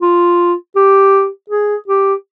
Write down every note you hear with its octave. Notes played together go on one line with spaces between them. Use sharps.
F4
G4
G#4
G4